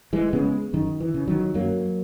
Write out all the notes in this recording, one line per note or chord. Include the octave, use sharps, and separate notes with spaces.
E3 G#3
C#3 G#3 B3
F#2 D#3
E3
C#3
D#3 F#3
F#2 F#3 A#3